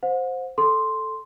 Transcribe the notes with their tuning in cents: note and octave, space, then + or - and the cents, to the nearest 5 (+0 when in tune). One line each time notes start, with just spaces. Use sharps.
C5 +0 F#5 -40
A4 +0 C6 +0